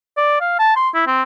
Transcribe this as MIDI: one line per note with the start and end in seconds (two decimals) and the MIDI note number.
0.17 0.39 74
0.41 0.58 77
0.59 0.75 81
0.76 0.89 84
0.94 1.02 64
1.07 1.23 60